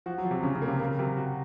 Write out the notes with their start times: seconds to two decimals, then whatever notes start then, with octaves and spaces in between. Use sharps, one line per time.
0.06 F3 F#4
0.18 F#3
0.24 F3
0.31 C3
0.43 C#3 C#4
0.55 C#3
0.62 A#3
0.68 C3
0.80 C#3 A#4
0.99 C3 F#3
1.17 F#4